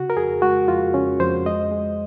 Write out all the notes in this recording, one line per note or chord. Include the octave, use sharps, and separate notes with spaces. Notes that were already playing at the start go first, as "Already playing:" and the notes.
Already playing: C#3 F#4
A#4
F2 G#4
G#3 F#4
F2 F4
C#3 C#4
F2 C5
G#3 D#5
G#3